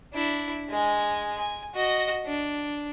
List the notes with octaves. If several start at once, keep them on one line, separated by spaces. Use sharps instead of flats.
D4 E4
G#3 G#5
G#5
F#4 D#5
D4